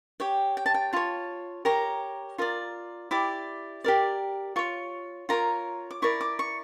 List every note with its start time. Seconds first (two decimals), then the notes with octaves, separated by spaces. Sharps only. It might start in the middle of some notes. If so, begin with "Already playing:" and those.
0.20 G4 C#5 G5
0.57 G5
0.66 A5
0.74 G5
0.93 F4 C#5 A5
1.65 G4 A#4 C#5 A#5
2.38 F4 A#4 D5
3.11 E4 G4 D5 D6
3.84 G4 A#4 D5
4.56 F4 C#5 C#6
5.29 F4 A#4 C#5 A#5
5.91 D6
6.02 E4 A#4 D5 C#6
6.21 D6
6.39 C#6